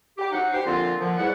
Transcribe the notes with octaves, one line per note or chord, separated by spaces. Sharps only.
G4
F#3 D#4 F#5
G4 C5
A#2 D3 F3 C4 F4
A#2 D3 F3
E2 G#2 G3 E4 F#5